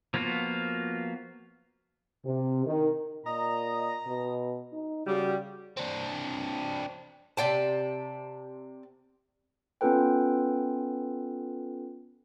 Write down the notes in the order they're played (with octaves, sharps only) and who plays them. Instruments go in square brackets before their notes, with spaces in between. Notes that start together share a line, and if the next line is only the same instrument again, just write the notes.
[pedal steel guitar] F3 A#3 B3 F4 F#4
[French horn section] C3
D#3
[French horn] A#2 [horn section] D#5 A#5
[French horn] B2
D#4
[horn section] C#3 G3 [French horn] F#4
[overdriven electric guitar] C4 D4
[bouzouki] C3 D5 G5 A5
[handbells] B3 C#4 F4 A4 B4 G5